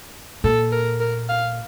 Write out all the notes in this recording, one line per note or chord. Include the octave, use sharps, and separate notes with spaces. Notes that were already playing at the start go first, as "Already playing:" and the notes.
A#2 A4
A#4
A#4
F5